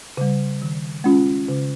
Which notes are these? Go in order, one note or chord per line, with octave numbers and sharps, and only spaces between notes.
C#3 G3
D#3
G#3 C#4 F4
C#3